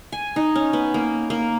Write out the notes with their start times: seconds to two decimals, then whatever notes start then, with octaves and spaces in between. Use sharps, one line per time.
0.12 G#5
0.36 D#4
0.55 C#4
0.73 B3
0.94 A#3
1.30 A#3